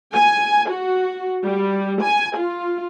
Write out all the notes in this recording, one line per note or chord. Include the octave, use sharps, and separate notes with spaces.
G#5
F#4
G3
G#5
F4